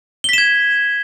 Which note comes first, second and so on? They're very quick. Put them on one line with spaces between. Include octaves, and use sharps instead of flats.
G7 B6 E7 G#6